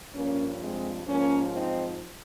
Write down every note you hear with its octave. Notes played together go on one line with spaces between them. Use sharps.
G2 F3 A#3 C#4
G#3 C4
G#2 F3 A#3 C#4
C4 D#4